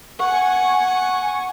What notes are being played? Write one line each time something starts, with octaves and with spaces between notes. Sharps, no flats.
F#5 G#5 C#6